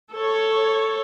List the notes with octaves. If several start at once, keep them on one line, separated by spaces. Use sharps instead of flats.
A4 C#5